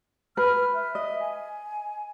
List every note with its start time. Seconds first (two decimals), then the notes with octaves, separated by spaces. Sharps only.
0.37 B4 F6
0.74 E5
0.95 D#5
1.20 G#5